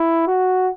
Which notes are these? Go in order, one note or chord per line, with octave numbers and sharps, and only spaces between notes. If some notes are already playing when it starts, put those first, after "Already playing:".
Already playing: E4
F#4